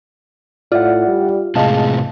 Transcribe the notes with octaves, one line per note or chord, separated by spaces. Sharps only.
A2 F4 D5 E5 F#5
G3
A2 C3 G#3 C4 D#5 F5 A5